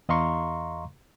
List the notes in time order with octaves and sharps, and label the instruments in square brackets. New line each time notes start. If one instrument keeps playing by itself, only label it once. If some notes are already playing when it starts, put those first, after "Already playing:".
[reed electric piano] E2 D#5 F5 A#5 C6 C#6